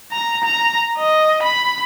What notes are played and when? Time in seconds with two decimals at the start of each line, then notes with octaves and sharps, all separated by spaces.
0.12 A#5
0.44 A#5
0.98 D#5
1.43 B5